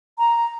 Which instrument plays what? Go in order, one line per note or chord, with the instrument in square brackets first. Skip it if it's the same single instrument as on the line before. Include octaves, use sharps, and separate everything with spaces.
[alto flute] A#5